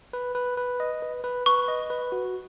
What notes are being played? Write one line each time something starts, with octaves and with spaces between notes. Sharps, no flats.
B4
B4
B4
D#5
B4
B4
B4 C#6
D#5
B4
F#4